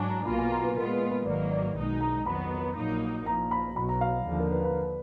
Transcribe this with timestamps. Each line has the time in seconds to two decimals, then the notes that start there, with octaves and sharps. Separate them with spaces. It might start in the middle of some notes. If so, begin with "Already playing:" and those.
Already playing: G#2 F#3 D4 G#5
0.09 A#5
0.26 B1 B2 A#3 F4 B5
0.38 G#5
0.51 A#5
0.64 B4
0.76 A#2 G#3 B3 F4 A#4
0.92 B4
1.10 B4
1.25 G#1 G#2 D#3 F#3 A#3 D5
1.52 D5
1.76 B1 B2 G#3 D#4
2.01 A#5
2.26 F2 D#3 F#3 B3 B5
2.76 A#1 A#2 F#3 A#3 D#4
3.26 A#1 A#2 F3 A#5
3.51 B5
3.76 B1 B2 F#3 B5
3.89 A#5
4.01 F5
4.26 D#2 D3 F3
4.39 A#4
4.51 B4
4.64 B4